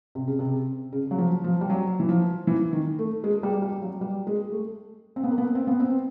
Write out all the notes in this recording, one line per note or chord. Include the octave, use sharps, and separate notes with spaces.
C3
C#3
C3
C#3
F#3
F3
F3
G3
F#3
E3
F3
E3
D#3
A3
G#3
G3
G3
F#3
G3
G#3
A3
C4
B3
A#3
B3
C4
B3
C4